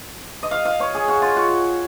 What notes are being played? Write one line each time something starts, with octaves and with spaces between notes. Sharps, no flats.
D#5
F5
F5
C#5
G#4
F#4
F4
F#4